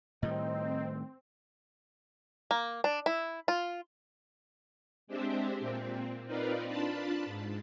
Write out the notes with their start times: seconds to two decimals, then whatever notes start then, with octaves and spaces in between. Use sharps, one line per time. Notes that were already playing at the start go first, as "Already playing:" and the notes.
0.23 A2 D#3 G3 C4 D#4
2.51 A#3
2.84 D4
3.06 E4
3.48 F4
5.07 G#3 C4 D4 G4 C5 E5
5.60 A#2 C4
6.26 C4 D#4 F4 A#4 B4 D5
6.67 D4 F4 A5 B5
7.25 G#2